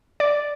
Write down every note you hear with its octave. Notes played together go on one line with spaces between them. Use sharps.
D5